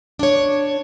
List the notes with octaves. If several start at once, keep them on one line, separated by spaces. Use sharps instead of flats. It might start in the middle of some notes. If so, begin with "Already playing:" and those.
D4 C#5